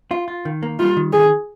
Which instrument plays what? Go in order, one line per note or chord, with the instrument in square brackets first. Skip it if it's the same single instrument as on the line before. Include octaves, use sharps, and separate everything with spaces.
[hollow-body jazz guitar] F4
F4
D#3
A#3
[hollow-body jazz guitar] G3 [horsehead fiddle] F4
[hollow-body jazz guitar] D#3
[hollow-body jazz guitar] D#3 [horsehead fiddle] G#4